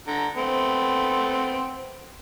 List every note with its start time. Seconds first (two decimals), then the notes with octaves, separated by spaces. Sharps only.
0.08 D3 A#5
0.37 A3 B3 C4